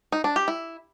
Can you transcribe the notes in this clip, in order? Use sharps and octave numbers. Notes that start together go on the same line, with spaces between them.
D#4
D4
G4
E4